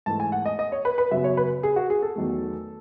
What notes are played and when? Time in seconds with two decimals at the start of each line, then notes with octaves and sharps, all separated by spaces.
0.06 G#2 E3 A3 A5
0.20 G#5
0.32 F#5
0.46 D#5
0.59 D#5
0.72 C#5
0.85 B4
0.98 B4
1.11 F#2 C#3 F#3 B3 E5
1.24 C#5
1.37 B4
1.63 G#4
1.76 F#4
1.90 G#4
2.02 A4
2.16 E2 D#3 F#3 A3